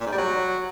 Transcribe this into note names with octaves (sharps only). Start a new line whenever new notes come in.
A#2
G#2
G3
F#3